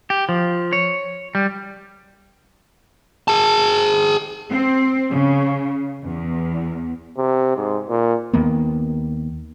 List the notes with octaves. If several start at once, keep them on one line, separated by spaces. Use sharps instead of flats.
G4
F3
C#5
G3
G#4 A5
C4
C#3
E2
C3
G#2
A#2
D#2 D#3 A#3 B3